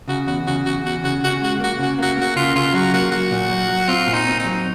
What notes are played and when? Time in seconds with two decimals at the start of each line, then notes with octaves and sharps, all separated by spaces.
0.08 C#3 F#4
0.26 E2 F#4
0.47 C#3 F#4
0.65 E2 F#4
0.83 E2 F#4
1.04 C#3 F#4
1.23 C#3 F#4
1.42 G#3 F#4
1.60 A#3 F#4
1.79 C#3 F#4
1.99 A#3 F#4
2.17 A#3 F#4
2.36 C#3 F4
2.55 C#3 F4
2.73 F#3 F#4
2.94 A#3 F#4
3.11 F#3 F#4
3.31 A#2
3.49 F#3
3.69 F#3
3.88 C4 F4
4.07 A#2
4.13 D#4
4.27 C4
4.39 D#4
4.45 F#3